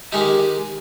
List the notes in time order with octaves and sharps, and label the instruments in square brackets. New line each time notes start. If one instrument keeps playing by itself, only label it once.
[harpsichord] D#3 G#3 D#4 [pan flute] G4